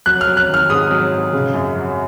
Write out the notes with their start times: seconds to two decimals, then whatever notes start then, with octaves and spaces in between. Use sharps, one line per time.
0.06 F#3 F#6
0.21 F6
0.27 F#3
0.37 F#6
0.48 D#3
0.54 F6
0.69 G#2 D#6
0.91 F#3
1.12 G#2
1.33 C#3
1.54 F#2
1.76 F#3